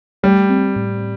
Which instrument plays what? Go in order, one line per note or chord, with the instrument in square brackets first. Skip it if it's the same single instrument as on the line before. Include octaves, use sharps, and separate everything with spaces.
[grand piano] G3 [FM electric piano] A3
[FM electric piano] C4
A2